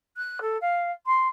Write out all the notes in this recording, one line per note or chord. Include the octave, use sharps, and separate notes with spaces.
F#6
A4
F5
C6